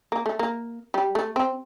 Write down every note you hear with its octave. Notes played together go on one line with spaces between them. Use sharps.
A#3
A3
A#3
G3
A3
C4